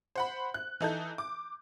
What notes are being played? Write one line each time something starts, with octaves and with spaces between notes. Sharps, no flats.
C5 F#5 B5
F#6
E3 D#4 A4 G6
D6